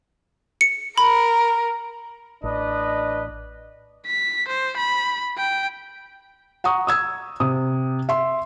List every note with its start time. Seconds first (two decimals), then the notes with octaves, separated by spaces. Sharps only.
0.61 C#7
0.98 A#4 B5
2.43 A1 D4 B4 D#5
4.07 B6
4.49 C5
4.78 B5
5.38 G5
6.64 F#5 A#5 C#6 D#6
6.87 D#6 E6 G#6
7.40 C3 D#6
8.09 E5 C6